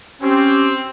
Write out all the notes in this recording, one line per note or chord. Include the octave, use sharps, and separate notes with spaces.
C4 C#4 G4